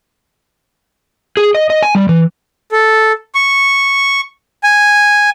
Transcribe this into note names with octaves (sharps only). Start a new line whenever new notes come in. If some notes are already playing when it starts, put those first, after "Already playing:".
G#4
D#5
D#5
G#5
G3
E3
A4
C#6
G#5